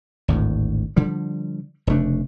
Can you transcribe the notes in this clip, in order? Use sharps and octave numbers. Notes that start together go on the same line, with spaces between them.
G#1 D2 A2
D3 F3 G3
F1 C#3 A3 D4